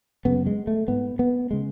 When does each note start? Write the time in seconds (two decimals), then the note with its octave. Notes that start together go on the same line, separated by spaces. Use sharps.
0.25 F#2 C#3 B3
0.46 G#3
0.67 A3
0.88 G#2 B3
1.19 B3
1.51 C#3 G#3